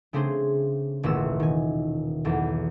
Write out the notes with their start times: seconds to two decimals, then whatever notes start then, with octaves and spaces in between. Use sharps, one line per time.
0.13 C#3 A3 C4 D4 G#4 C5
1.03 D#1 A1 B2 E6
1.40 D#3 G#5
2.25 B1 E2 A4